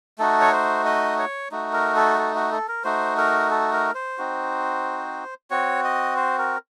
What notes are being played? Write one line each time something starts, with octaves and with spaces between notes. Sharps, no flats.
A3 D#4 F#4 A4
C#5
C5
D#5
C#5
A3 D#4 F#4
A#4
A4
A4
F#4
A4
A#4
A3 D#4 F#4 C5
A#4
A4
A#4
C5
C4 D#4 F#4
C4 F#4 C#5
D#5
C5
A#4